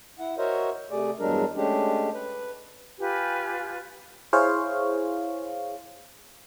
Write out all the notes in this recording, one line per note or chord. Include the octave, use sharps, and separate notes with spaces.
E4 F#5
F#4 A#4 C5 C#5 D#5 E5
C3 A3 G#4 D5
E2 G2 F#3 G#3 D4 A#4
G#3 A3 C#4 D4 G4
B4
F4 G4 B4 G#5
E4 G#4 C5 C#5 F5